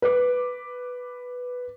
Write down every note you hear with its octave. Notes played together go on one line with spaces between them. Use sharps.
B4 D6